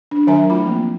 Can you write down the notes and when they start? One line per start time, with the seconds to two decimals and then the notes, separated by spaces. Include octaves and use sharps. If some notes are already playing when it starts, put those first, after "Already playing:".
0.11 D4
0.27 D#3 F#3 A#4 E5 G#5 A#5
0.50 A3 E4 F4 B5
0.65 F3 A#3 C4